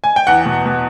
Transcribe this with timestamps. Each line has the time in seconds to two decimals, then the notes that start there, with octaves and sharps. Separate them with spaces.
0.04 G#5
0.16 G5
0.27 E2 F#5
0.46 B2
0.66 B2